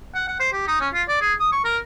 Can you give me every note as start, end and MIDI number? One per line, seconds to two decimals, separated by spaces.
0.15 0.28 78
0.28 0.39 78
0.40 0.51 72
0.53 0.64 67
0.68 0.80 63
0.80 0.88 61
0.93 1.03 65
1.08 1.17 74
1.21 1.34 68
1.40 1.50 87
1.52 1.62 85
1.64 1.78 70